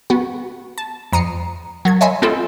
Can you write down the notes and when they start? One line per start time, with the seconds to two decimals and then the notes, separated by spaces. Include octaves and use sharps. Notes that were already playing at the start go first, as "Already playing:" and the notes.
0.10 B3 F#4
0.78 A5
1.12 F2 A#5 D#6 C7 C#7
1.85 F#3 A#4 G#6
2.01 C#5 D#5 E5 G#5 B5 C6
2.22 G#3 B3 C4 F4 A4